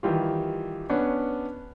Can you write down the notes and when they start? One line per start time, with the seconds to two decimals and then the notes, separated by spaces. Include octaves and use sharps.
0.03 D#3 E3 G3 F4
0.90 B3 C#4 D4